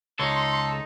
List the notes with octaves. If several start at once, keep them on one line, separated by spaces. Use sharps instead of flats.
C#2 D#4 A4 C#5 C6